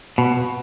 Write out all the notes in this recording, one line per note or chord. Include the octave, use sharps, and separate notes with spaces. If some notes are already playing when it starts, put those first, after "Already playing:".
B2